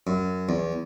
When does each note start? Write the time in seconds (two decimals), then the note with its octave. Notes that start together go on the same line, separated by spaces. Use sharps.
0.07 F#2
0.49 E2